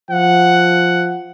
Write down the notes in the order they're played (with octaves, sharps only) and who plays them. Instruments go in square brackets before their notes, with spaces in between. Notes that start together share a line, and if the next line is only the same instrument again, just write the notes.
[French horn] F3 [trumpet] F#5